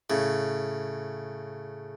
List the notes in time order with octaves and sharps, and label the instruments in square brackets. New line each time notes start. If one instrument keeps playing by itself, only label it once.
[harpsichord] A2 C#3